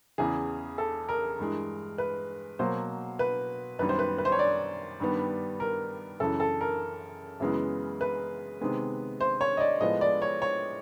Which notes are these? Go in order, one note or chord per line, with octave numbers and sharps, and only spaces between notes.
E2 C#3 E3 G#4
A4
A#4
G2 E3 G#3
B4
B2 F#3 A#3 C5
B4
F#2 D#3 G3 B3 B4
C5
B4
B4
C5
C#5
D5
G2 D#3 G3 B3
A#4
F#2 C#3 E3 A4
A4
A#4
F#2 C#3 E3 G#3 B3
B4
C3 D#3 G#3 B3
C5
C#5
D#5
D5
A2 F3 G#3 B3 D#5
D5
C#5
C#5